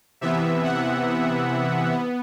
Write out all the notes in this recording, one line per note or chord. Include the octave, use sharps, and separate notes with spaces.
C3 E3 B3 E5
F#5
B3